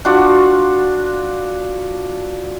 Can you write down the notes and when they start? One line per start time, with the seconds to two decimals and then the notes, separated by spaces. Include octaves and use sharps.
0.05 D4 F4 F#4 F#5